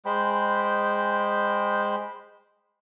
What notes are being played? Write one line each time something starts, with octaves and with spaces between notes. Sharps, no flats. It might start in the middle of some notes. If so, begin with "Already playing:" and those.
G#3 C5 G5 B5